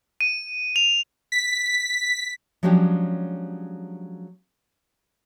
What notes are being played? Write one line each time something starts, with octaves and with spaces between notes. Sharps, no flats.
D#7
F7
B6
F3 F#3 G#3 C#4 D4 G4